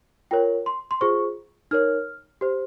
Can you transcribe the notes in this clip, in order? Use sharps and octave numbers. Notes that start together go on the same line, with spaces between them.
F4 A#4 C#5 G5
C6
C6
F4 G#4 C5 C#6
D#4 A#4 C#5 F6
G4 C5